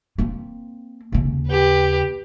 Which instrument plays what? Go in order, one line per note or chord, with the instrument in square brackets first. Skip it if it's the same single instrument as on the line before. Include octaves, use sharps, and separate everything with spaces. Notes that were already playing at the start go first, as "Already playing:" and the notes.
[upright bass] A#3 C4
D#2 C#3
[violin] G4 B4